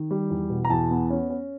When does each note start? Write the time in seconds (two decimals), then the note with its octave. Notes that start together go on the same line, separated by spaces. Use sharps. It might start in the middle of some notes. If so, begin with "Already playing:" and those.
Already playing: D#3
0.11 G3
0.30 E2
0.50 B2
0.65 A#5
0.70 E2 A5
0.91 B3
1.10 C#4
1.30 C#4